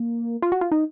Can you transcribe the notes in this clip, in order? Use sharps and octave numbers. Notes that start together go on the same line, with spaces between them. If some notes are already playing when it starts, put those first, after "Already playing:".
Already playing: A#3
F4
F#4
F4
D#4